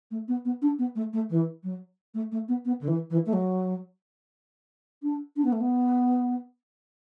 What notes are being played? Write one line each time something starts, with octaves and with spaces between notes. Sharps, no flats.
A3
B3
B3
D4
B3
A3
A3
E3
F#3
A3
A3
B3
B3
D3
E3
E3
A3
F#3
D4
D4
B3
A3
B3